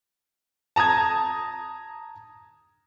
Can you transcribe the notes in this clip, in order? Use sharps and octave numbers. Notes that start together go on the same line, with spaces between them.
A5 A#5 D#6 G#6